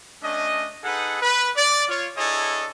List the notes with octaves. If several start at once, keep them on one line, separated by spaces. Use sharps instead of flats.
A3 C#4 D4 D#5
D#4 G#4 A4 B4 F#5
B4
D5
F4 C#5
D4 E4 G#4 A4 C#5 D#5